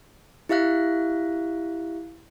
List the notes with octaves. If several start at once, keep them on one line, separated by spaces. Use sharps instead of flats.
E4 G4 E5 F5 F#6